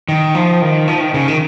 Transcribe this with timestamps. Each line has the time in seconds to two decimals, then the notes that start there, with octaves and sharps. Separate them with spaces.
0.09 D#3
0.35 F3
0.62 D#3
0.88 F3
1.01 D#3
1.14 C#3
1.28 D#3